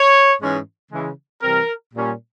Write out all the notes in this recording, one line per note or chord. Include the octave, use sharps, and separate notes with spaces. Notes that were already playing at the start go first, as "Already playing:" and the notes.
Already playing: C#5
G#2 E3 G#3 C#4
C#3 E3 G#3
C3 E3 G3 C4 A#4
A#2 G3 C#4